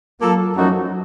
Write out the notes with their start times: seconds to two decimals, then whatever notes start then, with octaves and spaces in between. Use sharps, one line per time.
0.21 F#3 A#3 F4 A4
0.57 F#2 F3 F#3 A3 D#4 F#4